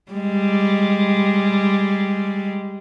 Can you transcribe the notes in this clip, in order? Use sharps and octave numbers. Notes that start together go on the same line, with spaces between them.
G3 G#3